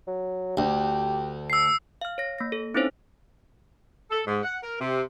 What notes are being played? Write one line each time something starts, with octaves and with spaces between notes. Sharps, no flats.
F#3
D2 G4
E6 C7
F5 F6
C#5 A#6
A#3 A#6
A4
C4 C#4 D#4 E4 C5 C#5
A4
G#2
F#5
A#4
C3